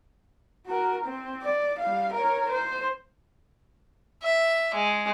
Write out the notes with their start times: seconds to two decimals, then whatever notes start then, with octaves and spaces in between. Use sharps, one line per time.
0.66 F#4 A#4
1.05 C4
1.43 D5
1.79 G3 F5
2.14 A#4 C#5
2.49 C5
4.23 E5
4.74 G#3